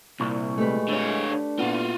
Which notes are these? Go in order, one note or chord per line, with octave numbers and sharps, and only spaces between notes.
C2 A#2 E4 C#6
G#3 A3 G4 B4
D3 C#5
D4
A#2 B3 F4 F#4